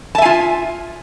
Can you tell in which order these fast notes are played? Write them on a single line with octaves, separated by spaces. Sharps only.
A5 E5 G#5 F4